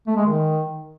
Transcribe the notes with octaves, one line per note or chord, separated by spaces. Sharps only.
A3
G#3
D#3